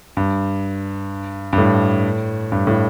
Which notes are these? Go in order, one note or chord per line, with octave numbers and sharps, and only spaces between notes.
G2
G2
A2
G2
A2